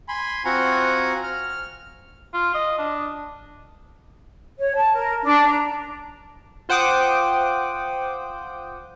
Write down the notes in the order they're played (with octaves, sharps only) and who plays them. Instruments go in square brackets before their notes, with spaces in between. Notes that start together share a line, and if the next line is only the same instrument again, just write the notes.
[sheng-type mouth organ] G#5 B5 C6
C4 F4 F#4 F#5 G#5 A#5
F6
[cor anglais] F4
D#5
D4
[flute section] C#5
A5
A#4
D4
A#5
[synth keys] F4 C5 F#5 G5 D6 D#6